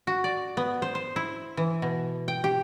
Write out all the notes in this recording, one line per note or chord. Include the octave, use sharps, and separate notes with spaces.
F#4
D5
B3
C5
C5
E4
E3
B2
G5
G4